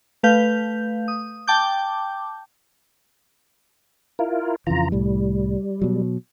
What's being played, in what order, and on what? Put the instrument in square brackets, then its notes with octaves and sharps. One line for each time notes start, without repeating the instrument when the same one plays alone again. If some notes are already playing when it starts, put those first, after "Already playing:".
[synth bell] A3 B4 F5 G6
D#6
G5 A5 D6 G6
[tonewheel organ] E4 F4 A#4
[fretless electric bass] F2 C#3 E3 [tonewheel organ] F4 A#5
[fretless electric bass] C2 A2 [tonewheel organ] G3
[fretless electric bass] B2 F#3